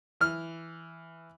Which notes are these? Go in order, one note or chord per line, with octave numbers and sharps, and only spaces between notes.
E3 F6